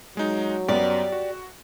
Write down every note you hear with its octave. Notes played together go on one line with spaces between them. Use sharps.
F#3 G#3 D#4
F#2 B3 G4 D5
F#4